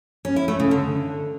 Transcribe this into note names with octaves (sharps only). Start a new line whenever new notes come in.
C#4
E4
A3
C#3
D3